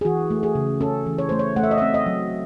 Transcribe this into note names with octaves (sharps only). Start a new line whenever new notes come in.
G#4
E3 F#4
A3
G#4
C#3
C#4 A4
E3
C#5
A3 C5
C#5
A3 F#5
E5
D#5
E5
C4
D#5
F#3